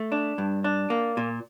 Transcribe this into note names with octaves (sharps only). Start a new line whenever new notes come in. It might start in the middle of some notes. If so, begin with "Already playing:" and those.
Already playing: A3
D4
G2
D4
A#3
A#2